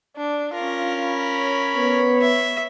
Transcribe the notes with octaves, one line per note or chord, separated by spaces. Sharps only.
D4
C#4 F4 A#4
B5
C#5
B3
E5